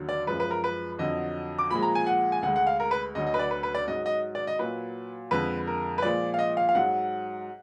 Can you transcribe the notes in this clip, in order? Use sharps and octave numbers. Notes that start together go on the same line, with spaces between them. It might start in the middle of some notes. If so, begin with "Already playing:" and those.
Already playing: D#2 D3 F#3
D5
F#2 F3 G#3 B4
B4
A#4
B4
F2 D3 F#3 D#5
D6
A#2 F3 G#3 B5
A#5
G#5
F#5
G#5
D2 D3 G#3 F#5
F#5
F5
A#4
B4
D2 D3 F#3 D#5
D#5
B4
D5
B4
B4
D5
G#2 F#3 D#5
D#5
D5
D#5
A#2 F#3 B4
F2 D3 G#3 B4
A#4
B4
A#2 F3 G#3 D5
F5
D#5
F5
F5
G#2 F#3 F#5